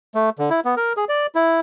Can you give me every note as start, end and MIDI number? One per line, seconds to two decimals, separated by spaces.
0.15 0.30 57
0.39 0.50 50
0.50 0.60 64
0.65 0.75 59
0.77 0.93 70
0.97 1.05 68
1.09 1.27 74
1.35 1.60 64